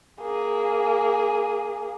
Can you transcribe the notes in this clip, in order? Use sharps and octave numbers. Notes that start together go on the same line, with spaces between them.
A#3 G#4